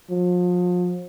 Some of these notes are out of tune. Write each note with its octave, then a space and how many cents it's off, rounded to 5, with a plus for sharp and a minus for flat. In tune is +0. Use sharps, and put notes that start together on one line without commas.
F3 +35